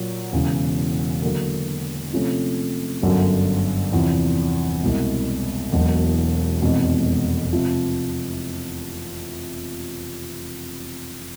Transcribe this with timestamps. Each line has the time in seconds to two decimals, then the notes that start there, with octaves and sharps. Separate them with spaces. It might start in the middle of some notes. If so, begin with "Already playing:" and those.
Already playing: A#2 F#3 A#3
0.33 E1 E2 C#3
1.22 D3 F#3 A#3
2.13 C3 F3 A3 C#4
3.02 G1 F#2 D3 F#3
3.92 E2 C3 F3
4.83 C2 B2 G#3
5.72 E1 E2 B2 F#3 A#3
6.62 F1 E2 B2 G#3 C4
7.53 C3 F3